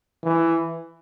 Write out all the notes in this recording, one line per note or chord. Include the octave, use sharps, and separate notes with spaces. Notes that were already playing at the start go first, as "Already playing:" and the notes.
E3